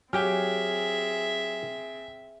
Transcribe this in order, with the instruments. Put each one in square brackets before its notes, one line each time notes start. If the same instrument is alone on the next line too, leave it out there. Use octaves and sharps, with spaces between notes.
[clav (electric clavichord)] F#3 G4 G5 [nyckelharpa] C4 G#4 [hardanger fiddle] E5 [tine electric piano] G#5 F6